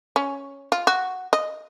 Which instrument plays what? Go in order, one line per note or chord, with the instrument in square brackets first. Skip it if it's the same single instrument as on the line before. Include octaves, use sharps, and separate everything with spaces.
[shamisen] C#4
F4
F#4
D#5